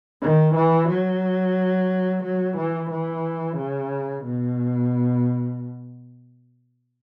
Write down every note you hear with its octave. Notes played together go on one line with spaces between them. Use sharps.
D#3
E3
F#3
F#3
E3
E3
C#3
B2